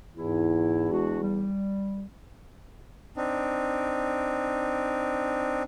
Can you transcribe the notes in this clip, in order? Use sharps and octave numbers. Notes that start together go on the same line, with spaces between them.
E2 G#2 E4
G#3 D4 F#4
G3
C4 D4 D#4